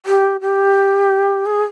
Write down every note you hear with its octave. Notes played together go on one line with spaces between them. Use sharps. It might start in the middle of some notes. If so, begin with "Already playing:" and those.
G4
G4
G#4